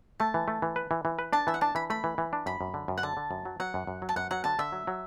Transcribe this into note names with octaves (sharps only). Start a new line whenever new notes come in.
A3 A5
E3
A3
E3
B4
E3
E3
B4
D4 A5
E3 E5
F#5
D4 A5
E3 B5
A3 B5
E3
E3
D4
F#2 B5
F#2
D3
F#2
F#5
D3 A5
D3
F#2
F#3
F#3 F#5
F#2
F#2
F#3
A5
F#2 F#5
F#3 F#5
D3 A5
D3 E5
F#3
F#3